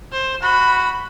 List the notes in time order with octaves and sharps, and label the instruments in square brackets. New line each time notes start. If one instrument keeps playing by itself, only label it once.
[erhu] C5
[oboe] F#4 [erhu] B5